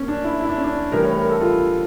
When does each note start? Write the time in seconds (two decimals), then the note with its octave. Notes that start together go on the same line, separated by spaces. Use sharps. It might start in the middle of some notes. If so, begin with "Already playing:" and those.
Already playing: A#3 C#4
0.08 D4
0.24 E4
0.41 E4
0.49 D4
0.57 C#4
0.64 D4
0.92 A2 E3 G3 A#4
1.04 C#5
1.17 A#4
1.29 A4
1.41 F4